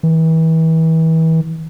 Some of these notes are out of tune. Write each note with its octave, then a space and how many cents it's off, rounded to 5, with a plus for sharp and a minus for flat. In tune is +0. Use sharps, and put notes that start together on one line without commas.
E3 -35